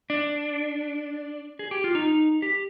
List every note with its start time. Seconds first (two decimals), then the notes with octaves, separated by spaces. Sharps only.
0.10 D4
1.59 G#4
1.71 G4
1.84 F4
1.95 D#4
2.42 G4